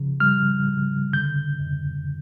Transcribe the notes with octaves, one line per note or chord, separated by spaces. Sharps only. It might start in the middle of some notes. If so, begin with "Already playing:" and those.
Already playing: C#3 F3
G3 F6
C#3
D3 G6
F2